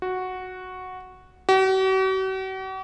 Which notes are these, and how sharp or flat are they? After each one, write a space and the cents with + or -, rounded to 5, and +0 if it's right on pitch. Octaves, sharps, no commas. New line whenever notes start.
F#4 -5
F#4 +45